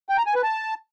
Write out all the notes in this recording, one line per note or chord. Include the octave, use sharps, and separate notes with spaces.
G5
A#5
G#5
B4
A5